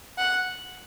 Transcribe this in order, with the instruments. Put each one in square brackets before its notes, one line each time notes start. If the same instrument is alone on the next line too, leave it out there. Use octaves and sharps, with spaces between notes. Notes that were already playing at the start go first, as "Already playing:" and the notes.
[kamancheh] F#5